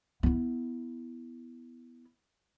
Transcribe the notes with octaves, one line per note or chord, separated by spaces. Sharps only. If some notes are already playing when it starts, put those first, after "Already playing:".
B3 E4